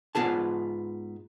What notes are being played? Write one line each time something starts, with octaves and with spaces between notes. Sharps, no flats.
G#2 B3 F4 G#4 A5